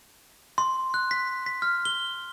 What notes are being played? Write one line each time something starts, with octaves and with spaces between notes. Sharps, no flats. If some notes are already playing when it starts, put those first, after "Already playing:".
C6
F#6
B6
B6
F6
G7